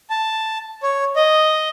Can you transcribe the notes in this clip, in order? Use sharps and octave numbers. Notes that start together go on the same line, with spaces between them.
A5
C#5
D#5